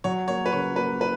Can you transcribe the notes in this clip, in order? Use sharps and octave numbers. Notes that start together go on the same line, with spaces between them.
F#3 C#5
A#3 C#5
B4
C#3 C#5
A#3 B4
E4 B4